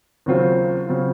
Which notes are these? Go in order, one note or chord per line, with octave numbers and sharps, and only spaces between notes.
D#2 C#3 F#3 C4 F4
C#3 F#3 C4 F4